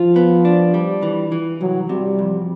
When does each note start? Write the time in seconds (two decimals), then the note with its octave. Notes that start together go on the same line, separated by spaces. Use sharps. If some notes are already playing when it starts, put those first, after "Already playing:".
Already playing: F3 F4
0.16 B3
0.45 D4
0.74 G3
1.02 E3
1.32 E3
1.61 C2 F#3
1.89 C3 G3
2.19 F2